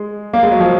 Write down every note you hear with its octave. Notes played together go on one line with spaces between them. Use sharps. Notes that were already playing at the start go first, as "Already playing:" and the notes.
Already playing: G#3
A#3
G#3
F#3
F3